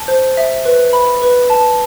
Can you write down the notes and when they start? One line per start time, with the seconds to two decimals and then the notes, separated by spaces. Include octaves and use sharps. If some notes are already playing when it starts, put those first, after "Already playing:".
Already playing: A5
0.08 C5
0.37 E5
0.65 B4
0.93 B5
1.22 B4
1.50 A5